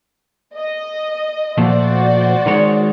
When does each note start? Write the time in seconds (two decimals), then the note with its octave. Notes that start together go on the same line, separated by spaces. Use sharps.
0.54 D#5
1.58 A#2 F3 A3 F#4 C5 D5
2.46 D#3 G#3 C#5